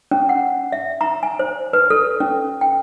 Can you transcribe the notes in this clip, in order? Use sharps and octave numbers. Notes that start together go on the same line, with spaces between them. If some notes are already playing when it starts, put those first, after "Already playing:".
C#4
F#5
E5
A#5
G#5
C5
B4
A4
C#4
G5